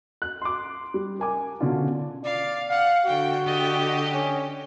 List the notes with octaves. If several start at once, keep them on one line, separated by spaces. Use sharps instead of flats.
F#6
C6 D6
G3
A#4 G#5 D6
B2 D3 C#4 D4 F4
D5 F5
F5 F#5
D3 F#4 G5
D3 G4 D#5
C#4